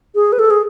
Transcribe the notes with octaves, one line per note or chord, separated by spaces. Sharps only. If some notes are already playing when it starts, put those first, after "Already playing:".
G#4
B4
A4
G#4